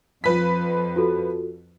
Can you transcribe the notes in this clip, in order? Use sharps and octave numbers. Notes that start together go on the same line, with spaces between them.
F2 F3 B4 B6
F4 F#4 A4